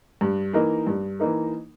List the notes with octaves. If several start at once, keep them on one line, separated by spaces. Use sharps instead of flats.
G2
E3 A#3 D#4 A#4
G2
E3 A#3 D#4 A#4